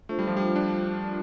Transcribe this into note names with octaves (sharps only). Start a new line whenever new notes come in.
A3 D4 F4 C5
G3
F3
G3
D4
D4 F4 A#4 D5